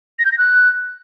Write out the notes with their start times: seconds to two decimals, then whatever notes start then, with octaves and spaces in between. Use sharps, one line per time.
0.19 A#6
0.25 G6
0.32 A#6
0.38 F#6